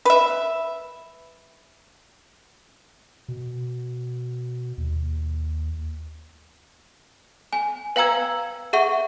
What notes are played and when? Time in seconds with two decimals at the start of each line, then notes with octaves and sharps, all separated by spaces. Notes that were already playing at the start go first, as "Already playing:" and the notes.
0.05 B4 E5
3.28 B2
4.78 D#2
7.53 G#5
7.96 B4 F5 G5 A#5 E6 G#6
8.73 G#4 E5 F#5 C#6